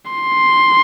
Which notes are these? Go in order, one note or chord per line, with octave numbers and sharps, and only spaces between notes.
C6